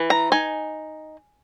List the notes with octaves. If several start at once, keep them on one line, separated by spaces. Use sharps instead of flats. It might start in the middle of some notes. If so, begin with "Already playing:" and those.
Already playing: E3
A#5
D#4 G#5